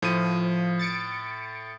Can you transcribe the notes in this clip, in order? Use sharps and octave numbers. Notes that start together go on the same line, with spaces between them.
A2 F3 D#7
A6 C#7 D7